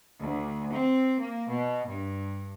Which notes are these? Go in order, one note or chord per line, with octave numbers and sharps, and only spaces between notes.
D2
C4
A#3
B2
G2